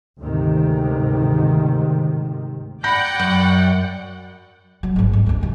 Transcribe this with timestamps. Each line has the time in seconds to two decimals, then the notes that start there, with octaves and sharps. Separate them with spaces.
0.20 D2 G#2 C3 D#3
2.84 D5 F#5 G5 B5 G6 A#6
3.20 F#2
4.83 F#3
4.96 G#1 G#2
5.13 F2
5.26 G1 D2
5.41 C#2 F#2